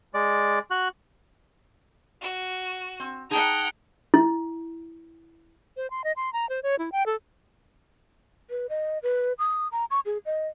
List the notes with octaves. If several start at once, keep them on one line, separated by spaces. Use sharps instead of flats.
G#3 D5
F#4 F#6
F#4
C4
D#4 G#4 F#5 G5 A5 A#5
E4
C5
C6
D#5
C6
A#5
C5
C#5
E4
G5
A4
B4
D#5
B4
D#6
A#5
C#6
G#4
D#5